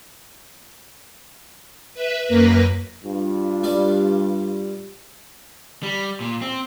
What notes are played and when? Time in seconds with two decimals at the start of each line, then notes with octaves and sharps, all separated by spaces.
1.94 B4 E5
2.26 F#2 A#3 A#4 B4 A#6
3.03 G2 F4
3.64 G3 D5
5.83 G3
6.21 A#2
6.42 C4